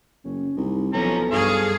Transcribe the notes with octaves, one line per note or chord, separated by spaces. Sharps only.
F#1 C#4
C2 D#4
B1 F3 C#4 A4 A#5
G2 G#4 C#5 F5